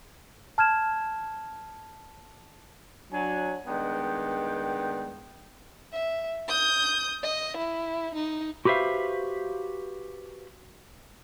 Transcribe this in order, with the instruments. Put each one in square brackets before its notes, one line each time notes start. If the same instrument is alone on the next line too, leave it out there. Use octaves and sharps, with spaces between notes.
[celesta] A5 F6 G#6 E7
[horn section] F#3 D4 G#5
G2 D#3 G#3 B3 G5
[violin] E5
D#6 G6
D#5
E4
D#4
[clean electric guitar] F#4 G4 B4 C5 E5 F5